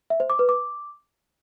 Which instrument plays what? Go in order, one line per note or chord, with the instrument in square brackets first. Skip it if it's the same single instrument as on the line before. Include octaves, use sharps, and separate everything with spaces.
[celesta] E5
C5
D6
B4
D6